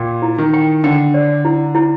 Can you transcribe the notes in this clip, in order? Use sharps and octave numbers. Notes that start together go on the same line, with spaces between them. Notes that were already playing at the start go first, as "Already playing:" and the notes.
Already playing: A#2 G5
E4
D#3
G5
D3 G5
D5
E4
E4